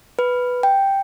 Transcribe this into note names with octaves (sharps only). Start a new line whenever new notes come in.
B4
G5